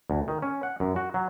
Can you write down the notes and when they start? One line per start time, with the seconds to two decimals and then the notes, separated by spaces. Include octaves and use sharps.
0.10 D2
0.28 D#3
0.42 C#4
0.63 F#5
0.80 F#2
0.96 F#4
1.14 F#3